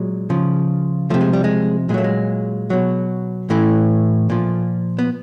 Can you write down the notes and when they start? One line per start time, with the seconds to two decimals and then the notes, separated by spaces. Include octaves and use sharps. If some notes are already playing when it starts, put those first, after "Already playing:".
Already playing: A#2 F#3 G#3
0.30 C#3 F3
1.10 C3 F3 A3
1.21 G#3
1.33 G3
1.44 G#3
1.89 A#2 G#3
1.94 F#3 A3
2.04 G#3
2.70 B2 F#3
3.50 A2 E3 A3
4.30 A#2 F3
4.99 B3